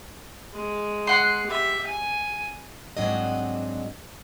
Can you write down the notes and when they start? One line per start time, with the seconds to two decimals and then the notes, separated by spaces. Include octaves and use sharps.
0.53 G#3
1.07 F#5 C6
1.47 G4 E5
1.87 G#5
2.97 G#2 F#3 C4 D4 F#4 D#5